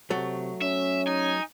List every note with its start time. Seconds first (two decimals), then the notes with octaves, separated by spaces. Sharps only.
0.10 C3 F#3 A3
0.62 C#4 E5
1.07 D#4 G#5